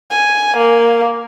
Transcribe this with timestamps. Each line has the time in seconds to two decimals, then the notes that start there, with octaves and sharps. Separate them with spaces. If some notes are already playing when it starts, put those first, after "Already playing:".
0.10 G#5
0.57 A#3